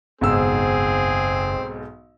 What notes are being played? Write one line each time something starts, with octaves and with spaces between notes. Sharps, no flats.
F#1 B1 G#2 C4 G#4 E6